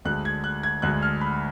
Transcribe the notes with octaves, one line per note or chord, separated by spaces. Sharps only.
D2 D3 G#3 F#6
G#6
F#6
G#6
D2 D3 G#3 F#6
F6
B5